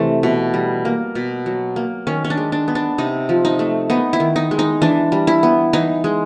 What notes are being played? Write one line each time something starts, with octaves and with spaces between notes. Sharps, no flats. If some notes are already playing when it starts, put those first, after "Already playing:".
Already playing: C3 E3 A3
B2
G3
A#3
B2
F#3
A#3
D#3 C#4
C#4
D4
G#3
D4
B3
D4
C3 D#4
F3
D#4
A3
B3 D#4
E4
D#3
D#4
G#3
D#4
E3 D4
G3
E4
B3
E3 D#4
G#3